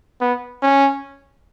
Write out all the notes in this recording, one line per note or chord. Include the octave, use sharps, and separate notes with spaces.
B3
C#4